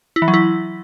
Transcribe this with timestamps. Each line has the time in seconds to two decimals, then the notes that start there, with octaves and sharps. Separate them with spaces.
0.16 E4
0.22 E3
0.28 F#3
0.34 E4